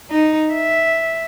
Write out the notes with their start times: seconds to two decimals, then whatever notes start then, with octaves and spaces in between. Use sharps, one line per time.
0.11 D#4
0.53 E5